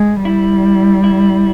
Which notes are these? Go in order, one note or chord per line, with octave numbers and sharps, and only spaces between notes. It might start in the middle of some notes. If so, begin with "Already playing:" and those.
Already playing: G#3
G3 E4
E4